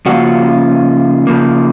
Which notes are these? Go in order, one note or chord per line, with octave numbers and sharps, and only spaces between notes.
C#3 F3 A#3 C#4 F4 F#4 F#5
C#3 F3 A#3